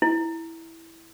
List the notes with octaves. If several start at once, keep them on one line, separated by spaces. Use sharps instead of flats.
E4